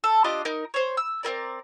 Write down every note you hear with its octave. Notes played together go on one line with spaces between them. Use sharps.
A4
D4 F4 G4 D#5
D#4 A#4
C5 C#5
E6
C4 F4 A#4 D5